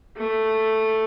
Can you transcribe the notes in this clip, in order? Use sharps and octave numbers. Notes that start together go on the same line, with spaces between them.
A3